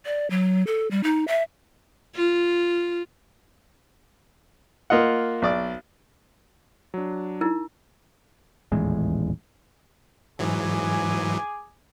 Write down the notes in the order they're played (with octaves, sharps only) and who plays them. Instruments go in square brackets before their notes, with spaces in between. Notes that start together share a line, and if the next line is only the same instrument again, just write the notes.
[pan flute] D5
F#3
A4
G3
D#4
E5
[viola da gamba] F4
[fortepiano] A#3 F4 D#5 F#5
B1 D5 D6
[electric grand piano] F#3 D4
[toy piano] D#4 E4 A#4
[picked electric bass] D#1 A1 E2 G#3
[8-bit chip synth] G#2 E3 F#3 [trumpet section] G#4 G#5 D6